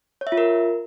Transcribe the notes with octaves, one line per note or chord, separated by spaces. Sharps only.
C#5
E5
F4
A#4